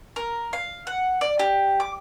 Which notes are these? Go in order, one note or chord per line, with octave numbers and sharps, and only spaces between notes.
A#4
F5
F#5
D5
G4
D6